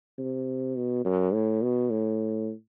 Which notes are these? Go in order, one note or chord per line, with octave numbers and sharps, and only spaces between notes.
C3
B2
F#2
A2
B2
A2